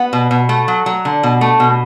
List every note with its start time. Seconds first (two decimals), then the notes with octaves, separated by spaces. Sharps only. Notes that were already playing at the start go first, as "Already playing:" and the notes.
Already playing: B3 F#5
0.13 B2
0.31 B2
0.49 A3
0.68 F#3
0.86 F#3
1.05 D3
1.23 B2
1.41 A3
1.60 B2